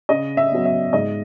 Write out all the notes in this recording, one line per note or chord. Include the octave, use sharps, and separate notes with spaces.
C#3 D#5
E5
F#3 B3
E5
G#2 D#5